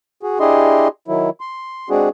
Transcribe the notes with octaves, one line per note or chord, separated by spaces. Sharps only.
F#4 G#4
D4 E4 G4 G#4 D#5 C6
D#3 F#3 E4
C6
G#3 C4 D4 F#4 G#4